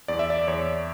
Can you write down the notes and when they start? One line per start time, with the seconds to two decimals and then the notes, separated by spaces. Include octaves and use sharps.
0.08 E2 D5
0.19 E5
0.30 D5
0.47 E2 C#5